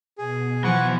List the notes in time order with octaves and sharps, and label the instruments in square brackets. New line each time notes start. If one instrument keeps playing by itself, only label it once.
[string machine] B2 [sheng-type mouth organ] G#4
[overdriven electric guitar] E3 [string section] F3 [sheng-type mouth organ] F#5 C#6